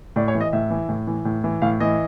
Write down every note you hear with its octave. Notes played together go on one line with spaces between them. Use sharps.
A2 D5
C#5
E3
D#5
A2 E5
E3
A2
E3
A2
E3
A2 F5
E3 D#5